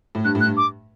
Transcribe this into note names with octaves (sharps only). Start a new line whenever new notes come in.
A2
G2 F#6
A2
F#6
G2
D6